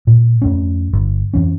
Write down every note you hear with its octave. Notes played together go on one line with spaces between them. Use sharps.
A#2
F2 A3 C#4
G1
F2 E3 C#4